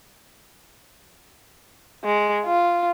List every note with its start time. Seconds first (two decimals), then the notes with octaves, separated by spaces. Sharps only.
2.04 G#3
2.46 F4